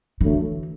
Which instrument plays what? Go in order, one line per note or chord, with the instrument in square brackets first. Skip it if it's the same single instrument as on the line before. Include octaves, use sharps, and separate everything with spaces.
[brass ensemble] D3 F#3 A3 [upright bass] E3